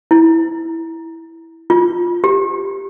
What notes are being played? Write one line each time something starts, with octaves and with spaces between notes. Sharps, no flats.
E4
F4
G4